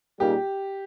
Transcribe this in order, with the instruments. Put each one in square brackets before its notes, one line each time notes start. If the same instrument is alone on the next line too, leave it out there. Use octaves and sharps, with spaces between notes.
[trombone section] A#2 G3 A#3 D#4 G#4 [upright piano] G4